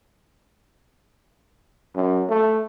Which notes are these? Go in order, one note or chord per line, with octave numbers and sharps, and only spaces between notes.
F#2
A3